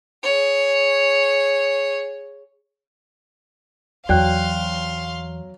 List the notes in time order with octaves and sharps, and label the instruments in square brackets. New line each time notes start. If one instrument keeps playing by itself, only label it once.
[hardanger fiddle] G#4 C#5
[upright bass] E2 [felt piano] F#3 [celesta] D5 G5 F#6 [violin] F5 C6